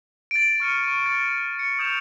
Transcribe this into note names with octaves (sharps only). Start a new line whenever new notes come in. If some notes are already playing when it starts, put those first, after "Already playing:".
A6 D7
C#6 F6 C#7 D#7
C#6 D#7
A6
C#7
D#6 G6 G#6 E7 F7